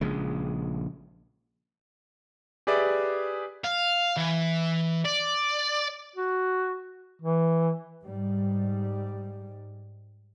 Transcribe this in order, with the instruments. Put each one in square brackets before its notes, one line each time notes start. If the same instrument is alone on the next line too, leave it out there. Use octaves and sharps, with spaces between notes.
[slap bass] A#1 C#3 G#3
[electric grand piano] G4 G#4 B4 D5 E5
[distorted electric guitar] F5
E3
D5
[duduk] F#4
E3
[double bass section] G#2 G3